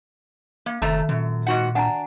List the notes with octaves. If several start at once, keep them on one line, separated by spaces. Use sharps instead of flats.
A#3
F#1 C3 D#3 A3 A#5
F#2 A#2
G#2 F#4 F#5
D4 F#5 G#5 A#5